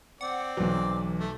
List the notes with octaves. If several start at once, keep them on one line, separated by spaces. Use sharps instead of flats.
C4 D5 F#5
B1 E3 F#3
A3